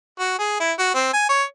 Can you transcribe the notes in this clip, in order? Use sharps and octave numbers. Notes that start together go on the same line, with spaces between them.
F#4
G#4
E4
F#4
C4
G#5
C#5